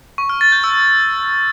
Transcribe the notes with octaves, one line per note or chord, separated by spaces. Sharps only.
C#6
F6
A6
G6
E6